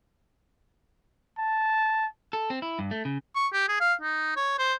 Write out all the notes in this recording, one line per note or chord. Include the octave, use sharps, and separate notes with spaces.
A5
A4
C4
E4
G2
A3
C#3
C#6
G4
G#4
F5
D#4
C#5
C5